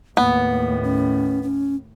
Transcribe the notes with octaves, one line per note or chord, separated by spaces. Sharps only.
D#2 A2 A#3 B3
C#4
C#4